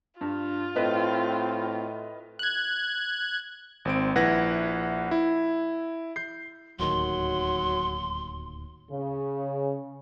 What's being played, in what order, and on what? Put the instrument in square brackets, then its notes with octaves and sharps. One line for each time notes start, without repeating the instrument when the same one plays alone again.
[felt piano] G2 [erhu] F4
[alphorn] A2 [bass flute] C4 [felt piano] B4 D#5
[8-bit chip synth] F#6 G#6
[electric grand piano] G#1 C4 D7
A#1 E4 B4 F#5 G#6 A#6
E4
G6 C7
[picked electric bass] D1 D#2 D#3 [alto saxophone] F#3 [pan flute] C6
[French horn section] C#3